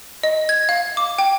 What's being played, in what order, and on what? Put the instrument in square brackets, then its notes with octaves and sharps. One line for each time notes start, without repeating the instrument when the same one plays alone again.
[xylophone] D#5
G#6
F5
D6
G5